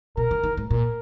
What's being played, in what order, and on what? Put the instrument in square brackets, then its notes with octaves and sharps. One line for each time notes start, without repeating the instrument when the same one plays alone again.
[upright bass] B2 [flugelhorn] A#4
[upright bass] D3
D#3
G#2
[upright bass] A#2 [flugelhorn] A#4